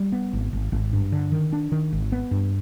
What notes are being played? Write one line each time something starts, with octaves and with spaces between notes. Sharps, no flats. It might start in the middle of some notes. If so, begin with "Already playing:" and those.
Already playing: G3
B3
G#1
G#1
G#1
G2
D3
D#3
D4
D#3
G#1
B3
G2